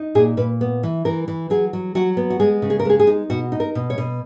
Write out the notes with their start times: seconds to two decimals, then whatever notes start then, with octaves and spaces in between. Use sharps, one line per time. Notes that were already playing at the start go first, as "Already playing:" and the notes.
Already playing: D#4
0.15 A#2 G#4
0.37 A#2 B4
0.61 B3
0.83 E3
1.05 E3 A#4
1.28 E3
1.50 F#3 G#4
1.73 F#3
1.95 F#3 F#4
2.17 B3
2.30 F#4
2.40 G#3 G#4
2.62 C#3
2.70 G#4
2.79 A#4
2.85 G#3 G#4
3.00 G#4
3.07 D#4
3.30 B2 F#4
3.52 D#4
3.60 A#4
3.75 B2
3.90 C#5
3.98 B2